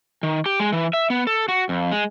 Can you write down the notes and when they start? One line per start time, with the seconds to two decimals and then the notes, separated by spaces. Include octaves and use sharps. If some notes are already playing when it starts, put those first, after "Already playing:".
0.23 D#3
0.46 G4
0.60 G#3
0.73 E3
0.93 E5
1.10 B3
1.27 A4
1.48 F#4
1.69 F2
1.92 G#3